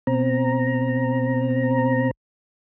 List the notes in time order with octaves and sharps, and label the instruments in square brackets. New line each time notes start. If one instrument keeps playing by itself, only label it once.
[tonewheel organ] B2 C4 A#5